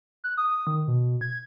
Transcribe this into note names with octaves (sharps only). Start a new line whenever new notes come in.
F#6
D#6
D#3
B2
G#6